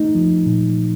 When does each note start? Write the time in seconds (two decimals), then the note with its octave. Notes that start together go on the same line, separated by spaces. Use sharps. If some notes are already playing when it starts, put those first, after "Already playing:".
Already playing: A3 D#4
0.15 F3
0.46 A#2